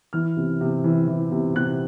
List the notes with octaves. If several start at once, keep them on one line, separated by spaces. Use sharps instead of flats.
E3 F6
C3
C3
E3
E3
C3
C3 F#6